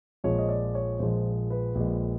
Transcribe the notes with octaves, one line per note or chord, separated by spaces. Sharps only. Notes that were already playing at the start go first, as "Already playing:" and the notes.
A#1 A#2 F3 G#3 C#5
D#5
D5
C#5
A#1 A#2 F3 G#3 C5
B4
A#1 A#2 F3 G#3